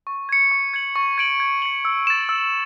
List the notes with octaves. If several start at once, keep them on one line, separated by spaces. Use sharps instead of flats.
C#6
G#6 C#7
C#6
G#6 C#7 F#7
C#6
G#6 D7 F#7
G#6
C#7 F#7
E6
A6 E7
E6